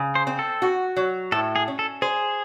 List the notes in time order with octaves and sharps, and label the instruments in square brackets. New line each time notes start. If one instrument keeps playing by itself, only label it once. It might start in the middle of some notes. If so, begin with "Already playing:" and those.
Already playing: [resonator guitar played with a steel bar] C#3
[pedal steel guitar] C5
[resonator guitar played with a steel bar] C4
[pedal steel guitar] A4
[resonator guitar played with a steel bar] F#4
F#3
[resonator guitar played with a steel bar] A2 [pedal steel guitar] A4
[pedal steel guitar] G#4
[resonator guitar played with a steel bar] C#4
[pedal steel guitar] A4
[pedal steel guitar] G#4 [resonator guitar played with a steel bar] C5